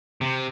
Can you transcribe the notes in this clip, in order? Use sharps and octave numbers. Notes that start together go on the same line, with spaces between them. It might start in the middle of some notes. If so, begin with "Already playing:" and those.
C3